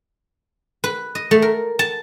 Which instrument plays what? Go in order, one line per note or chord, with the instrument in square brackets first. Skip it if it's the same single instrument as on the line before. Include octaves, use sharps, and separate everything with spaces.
[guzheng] B4
D#5
A3
A#4
A5